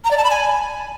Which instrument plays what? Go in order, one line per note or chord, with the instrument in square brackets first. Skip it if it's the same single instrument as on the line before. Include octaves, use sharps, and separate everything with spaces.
[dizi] A#5
D5
A5
B5
G#5